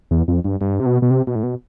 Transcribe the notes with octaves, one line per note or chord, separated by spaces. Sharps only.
E2
F2
G2
G2
C3
B2
B2
C3
B2
A2
B2